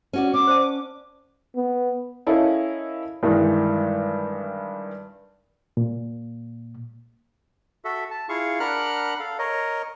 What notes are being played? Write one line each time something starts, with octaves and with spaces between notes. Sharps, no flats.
C#4 F#4 D5
C#4 D6
C5 D5 A5
B3
C#4 E4 A4 A#4 D#5 F5
G2 D#3 E3 G3 G#3
A#2
F#4 A4 E5
A5
E4 F4 G#4 F5 C#6
D4 A#4 F#5 B5 F6 F#6
A4 F5
A#4 C#5 D#5